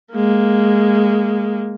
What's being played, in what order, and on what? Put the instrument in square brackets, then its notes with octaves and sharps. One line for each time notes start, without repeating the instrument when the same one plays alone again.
[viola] G#3 A#3